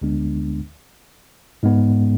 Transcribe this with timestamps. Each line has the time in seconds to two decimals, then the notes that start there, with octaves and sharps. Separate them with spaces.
0.02 D2 D3 G#3 B3 D4
1.63 G#2 G#3 B3